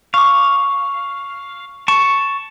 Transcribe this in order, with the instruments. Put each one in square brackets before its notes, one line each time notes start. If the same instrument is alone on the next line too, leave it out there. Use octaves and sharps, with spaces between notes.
[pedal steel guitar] F5 [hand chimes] C#6 D6
[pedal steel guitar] A5 C#6